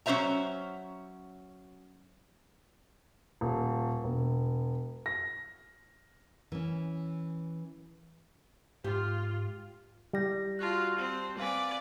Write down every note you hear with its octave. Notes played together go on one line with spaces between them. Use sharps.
F#3 C#4 G#4 C5 E5 A#5
D#1
E1
A#6
E3 C#4
G#2 F4 G4
G3 E4 A#6
F4 F#4 A5 F#6
C4 C5
C4 B4 D5 F5 G#5